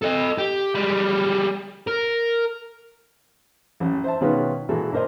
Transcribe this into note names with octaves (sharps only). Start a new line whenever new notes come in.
A4 D#5
G4
G3 G#3
A#4
A1 F#2
C5 E5 A5
B2 D#3 G#3 C#4 F4 B4
A#2 E3 G#3 F#4 A4
A#2 D4 A#4 C5 D#5